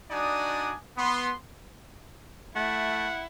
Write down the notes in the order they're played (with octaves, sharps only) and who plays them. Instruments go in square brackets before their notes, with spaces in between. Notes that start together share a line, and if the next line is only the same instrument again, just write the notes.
[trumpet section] D4 D#4 F#4 D5 G#5 D#6
B3 C6
[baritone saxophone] A3 [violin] E4 [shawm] F#5